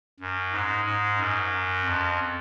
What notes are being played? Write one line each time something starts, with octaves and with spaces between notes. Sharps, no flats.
F#2
G#2
G#2
F#2
F2